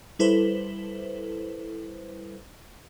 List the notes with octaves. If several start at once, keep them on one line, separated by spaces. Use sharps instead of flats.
G3 E4 A4 B4 C5